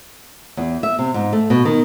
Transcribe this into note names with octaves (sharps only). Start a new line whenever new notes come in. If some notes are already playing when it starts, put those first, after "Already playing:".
E2
E5
C3
G#2
A3
B2
D#3